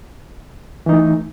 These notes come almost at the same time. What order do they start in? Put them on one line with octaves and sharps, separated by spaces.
E3 D#4 A3